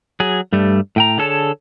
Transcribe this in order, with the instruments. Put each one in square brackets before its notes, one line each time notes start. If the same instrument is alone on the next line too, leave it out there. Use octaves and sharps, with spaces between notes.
[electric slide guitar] F#3 G#4
G2 G3 A3
A2 G5 A#5
D3 G#4 A4 C#5 A5